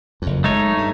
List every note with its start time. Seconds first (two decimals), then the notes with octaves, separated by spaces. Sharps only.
0.22 F#1 F2
0.44 G#3 A3 D#4 C#5
0.77 G2